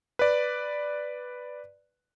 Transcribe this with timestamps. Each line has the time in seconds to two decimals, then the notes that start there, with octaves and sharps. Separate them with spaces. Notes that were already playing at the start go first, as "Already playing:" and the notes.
0.19 B4 D5